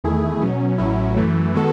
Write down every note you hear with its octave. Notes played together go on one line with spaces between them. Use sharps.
E2 D#3 A3 E4 G#4
B2 F#3 C#4
A1 A2 F#3 C#4 E4
F#2 E3 A3
D#3 G#3 B3 F#4 A4